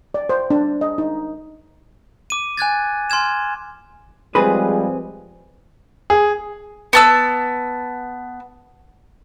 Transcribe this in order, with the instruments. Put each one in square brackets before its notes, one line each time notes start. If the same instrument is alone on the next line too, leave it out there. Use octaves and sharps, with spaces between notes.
[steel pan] D5
C5
D4
D#5
D#4
[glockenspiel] D6 D#7
G#5 F#6 G#6 A6
G#5 C6 F6 G#6 E7
[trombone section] F3 G3 G#3 [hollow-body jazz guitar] C4 G#4 B4
[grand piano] G#4
[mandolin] B3 A5 E6